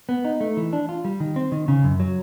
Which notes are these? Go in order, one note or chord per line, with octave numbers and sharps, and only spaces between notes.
B3
D#4
A3
E3
D4
F4
G3
D#3
C4
D#3
C#3
F#2
F#3